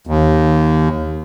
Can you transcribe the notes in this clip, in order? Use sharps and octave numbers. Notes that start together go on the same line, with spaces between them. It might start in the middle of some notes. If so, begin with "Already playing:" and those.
D#2